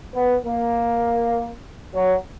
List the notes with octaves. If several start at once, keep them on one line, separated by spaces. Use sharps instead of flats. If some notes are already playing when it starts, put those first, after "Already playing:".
B3
A#3
F#3